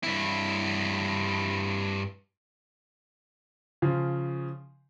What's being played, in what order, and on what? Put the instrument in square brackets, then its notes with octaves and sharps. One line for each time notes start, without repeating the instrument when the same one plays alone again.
[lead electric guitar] G2 E4
[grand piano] C#3 F3